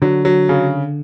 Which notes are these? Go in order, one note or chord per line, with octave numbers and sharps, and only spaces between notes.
D3 F#3
F#3
C#3